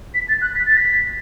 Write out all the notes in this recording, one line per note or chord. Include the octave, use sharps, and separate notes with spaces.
B6
A6
F#6
B6
A6
B6